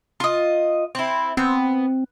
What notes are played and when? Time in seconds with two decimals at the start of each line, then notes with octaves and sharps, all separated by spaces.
0.20 F4 D#5
0.95 C4 E4
1.37 B3 C4